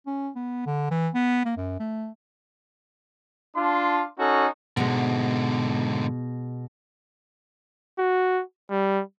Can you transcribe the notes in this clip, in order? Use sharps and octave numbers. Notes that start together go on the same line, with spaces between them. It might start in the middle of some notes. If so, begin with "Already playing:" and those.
C#4
B3
D3
E3
B3
A#3
F#2
A3
D4 F4 A5 C6
C#4 D#4 F#4 A4
G#2 B2 D3 G#3
F#4
G3